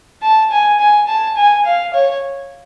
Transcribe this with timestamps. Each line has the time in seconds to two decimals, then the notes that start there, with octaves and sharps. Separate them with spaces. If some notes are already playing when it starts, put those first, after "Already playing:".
0.22 A5
0.51 G#5
0.80 G#5
1.08 A5
1.36 G#5
1.65 F5
1.94 C#5